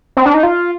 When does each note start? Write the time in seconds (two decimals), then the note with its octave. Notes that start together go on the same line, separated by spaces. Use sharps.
0.17 C4
0.26 D4
0.34 D#4
0.43 F4